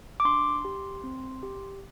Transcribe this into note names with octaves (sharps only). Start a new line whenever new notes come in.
D6
D4 C6
G4
C4
G4